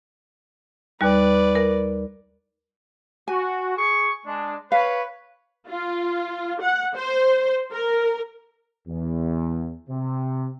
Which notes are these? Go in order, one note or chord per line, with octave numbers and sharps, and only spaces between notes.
D#2 G3 B4 D5
A#4
F#4 G#5
G#4 C#6
G#3 D4
B4 C#5 F5
F4
F#5
C5
A#4
E2
C3